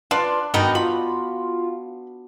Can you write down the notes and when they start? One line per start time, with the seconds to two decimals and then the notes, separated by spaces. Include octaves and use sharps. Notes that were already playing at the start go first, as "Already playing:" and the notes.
0.11 D4 F4 B4 D5 C6
0.54 G2 D#3 G3 B3 D#4 F#4
0.75 F4 B5